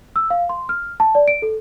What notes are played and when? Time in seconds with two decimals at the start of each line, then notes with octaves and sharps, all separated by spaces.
0.16 E6
0.30 F5
0.49 C6
0.69 F6
1.00 A5
1.15 D5
1.28 D7
1.42 A4